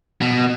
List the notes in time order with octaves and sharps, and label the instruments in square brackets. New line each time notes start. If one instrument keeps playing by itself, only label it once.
[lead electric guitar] B2